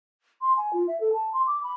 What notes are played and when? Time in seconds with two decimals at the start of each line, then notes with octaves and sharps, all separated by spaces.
0.41 C6
0.56 G#5
0.73 F4
0.87 E5
1.00 A4
1.12 A5
1.33 C6
1.46 D6
1.63 B5